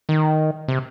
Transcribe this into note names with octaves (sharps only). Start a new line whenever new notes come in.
D#3
C3